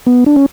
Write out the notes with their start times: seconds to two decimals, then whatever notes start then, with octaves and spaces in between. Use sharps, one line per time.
0.06 B3
0.26 D4
0.36 C#4